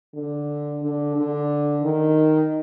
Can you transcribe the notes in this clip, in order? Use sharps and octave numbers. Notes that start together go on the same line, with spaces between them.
D3
D3
D3
D#3